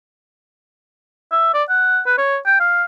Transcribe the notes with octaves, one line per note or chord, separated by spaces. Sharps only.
E5
D5
F#5
B4
C#5
G5
F5